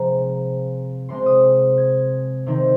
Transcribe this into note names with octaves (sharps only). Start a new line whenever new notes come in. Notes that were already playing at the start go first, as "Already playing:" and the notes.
Already playing: C3 F3 G#3 A#5
C3 G#3 C4 C6
D#6
G#6
C3 D#3 C4